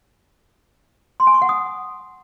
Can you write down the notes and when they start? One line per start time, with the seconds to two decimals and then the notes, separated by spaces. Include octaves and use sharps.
1.20 C6
1.27 G#5
1.34 C#6
1.42 F#5
1.49 D#6